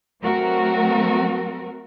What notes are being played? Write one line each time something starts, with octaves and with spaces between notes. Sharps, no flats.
F#3 A3 C4 F#4 A#4